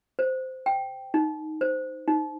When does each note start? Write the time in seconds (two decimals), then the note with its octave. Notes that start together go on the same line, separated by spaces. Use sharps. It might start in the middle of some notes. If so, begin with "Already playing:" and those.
0.19 C5
0.66 G5
1.14 D#4
1.61 C5
2.08 D#4